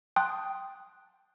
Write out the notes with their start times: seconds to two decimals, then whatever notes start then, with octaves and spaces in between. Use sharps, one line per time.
0.16 G5 A5 C6 D#6 F#6